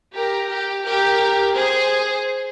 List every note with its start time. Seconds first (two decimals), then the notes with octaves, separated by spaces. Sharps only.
0.15 G4 A#4
0.51 G4
0.85 G4 A#4
1.55 G#4 C5